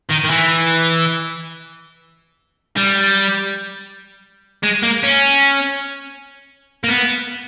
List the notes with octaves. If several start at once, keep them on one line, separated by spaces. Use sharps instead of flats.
D#3
D#3
E3
G3
G#3
A#3
C#4
A#3
B3